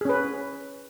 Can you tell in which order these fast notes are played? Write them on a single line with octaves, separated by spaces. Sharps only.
G#4 C#4 B4